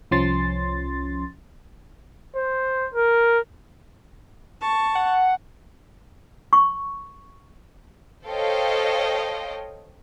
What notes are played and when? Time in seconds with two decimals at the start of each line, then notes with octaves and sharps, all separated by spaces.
0.11 C2 F3 C#4 C6 A6
2.36 C5
2.94 A#4
4.61 A5 C#6
4.95 F#5
6.53 C#6
8.26 A4 C5 C#5 D#5 F5 G5